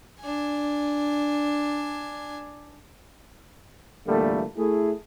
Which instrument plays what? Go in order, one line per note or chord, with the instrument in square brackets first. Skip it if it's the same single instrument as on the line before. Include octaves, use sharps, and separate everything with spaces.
[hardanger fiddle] D4 G#5
[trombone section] E2 A#2 D3 G3 A3 A#3
A3 E4 G#4